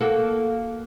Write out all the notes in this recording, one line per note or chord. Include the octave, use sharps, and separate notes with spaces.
A#3 F#4 A4